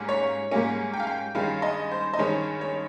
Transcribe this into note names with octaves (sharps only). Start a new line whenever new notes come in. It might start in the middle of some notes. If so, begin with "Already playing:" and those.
Already playing: G#2 G3 A#3 C#4
C#5
G#2 G3 A#3 C#4
G5
F5
G5
G2 D#3 G#3 C#4 F5
D#5
C5
D#5
G2 D#3 G#3 C#4 C#5
C#5